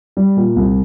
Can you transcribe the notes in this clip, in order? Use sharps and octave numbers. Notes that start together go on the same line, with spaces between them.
G3
A#2
C2